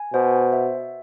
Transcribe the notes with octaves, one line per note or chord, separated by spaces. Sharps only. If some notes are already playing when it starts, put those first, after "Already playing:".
Already playing: G#5
B2 C5
E5